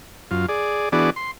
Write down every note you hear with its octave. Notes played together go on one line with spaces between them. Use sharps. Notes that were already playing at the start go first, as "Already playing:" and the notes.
F#2 F4
G#4 D5
E3 B3 D4 F#4 G#4 D5
C6